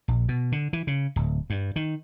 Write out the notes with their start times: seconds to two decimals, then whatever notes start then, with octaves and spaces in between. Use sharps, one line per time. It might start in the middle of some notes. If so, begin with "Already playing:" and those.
0.08 A#1
0.28 B2
0.52 D3
0.73 E3
0.87 C#3
1.16 D1
1.50 G2
1.76 D#3